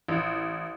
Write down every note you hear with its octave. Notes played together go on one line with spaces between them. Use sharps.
A1